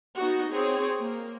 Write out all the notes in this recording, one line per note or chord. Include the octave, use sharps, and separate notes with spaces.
B3 D#4 F#4
C4 G#4 C#5
A#3